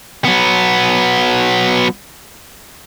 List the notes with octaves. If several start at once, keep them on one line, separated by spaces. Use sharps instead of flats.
F#3 B3